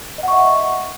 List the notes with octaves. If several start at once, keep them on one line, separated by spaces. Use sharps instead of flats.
D#5 E5 F#5 C#6